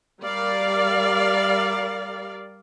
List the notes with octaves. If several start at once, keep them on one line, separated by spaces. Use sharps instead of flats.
G3 A#4 D5 F5